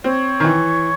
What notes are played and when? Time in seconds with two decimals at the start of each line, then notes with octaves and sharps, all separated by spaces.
0.04 C4 C#5
0.40 D#3
0.44 E3